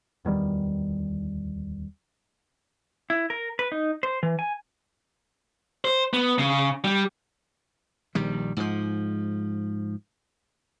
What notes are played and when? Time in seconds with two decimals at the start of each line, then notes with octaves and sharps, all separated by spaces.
0.25 D1 E2 D#3 G3
3.10 E4
3.30 A#4
3.59 B4
3.72 D#4
4.03 C5
4.23 E3
4.39 G#5
5.85 C5
6.13 B3
6.39 C#3
6.85 G3
8.15 A#1 D#3 G3
8.57 G#2 F3